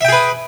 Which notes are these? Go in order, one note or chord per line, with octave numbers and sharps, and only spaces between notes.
G#4 B4 E5 G5